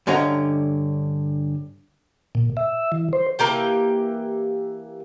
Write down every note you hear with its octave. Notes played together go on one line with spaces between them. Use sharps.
G2 D3 C#4 D#5 F#5 A#5
A#2
E5
E3
C5
E3 A#3 G4 G5